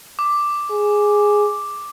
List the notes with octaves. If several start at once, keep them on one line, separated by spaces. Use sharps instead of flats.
D6
G#4